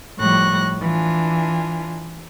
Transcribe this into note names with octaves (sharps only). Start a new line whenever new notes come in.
A2 F3 G3 C#6 F#6 A#6
E3 D4 F4 G#5